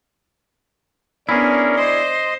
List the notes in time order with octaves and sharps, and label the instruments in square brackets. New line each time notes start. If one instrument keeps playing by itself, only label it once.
[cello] B3 D4 [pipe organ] C#4 A#4 [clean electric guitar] E4 G#4 [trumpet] D5
[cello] C5 [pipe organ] D#5 C6